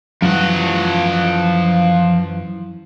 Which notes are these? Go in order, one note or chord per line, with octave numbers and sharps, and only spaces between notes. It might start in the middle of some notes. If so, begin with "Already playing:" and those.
F#2 E3 F3 F#5